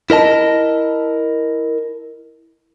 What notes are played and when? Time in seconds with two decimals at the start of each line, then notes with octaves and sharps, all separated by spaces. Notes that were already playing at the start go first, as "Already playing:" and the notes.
0.10 E4 A#4 D#5 A5